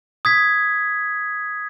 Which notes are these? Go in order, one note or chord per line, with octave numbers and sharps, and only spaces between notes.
D#6 G#6 B6